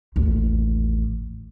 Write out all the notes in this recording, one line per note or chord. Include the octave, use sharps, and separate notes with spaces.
A1 D#2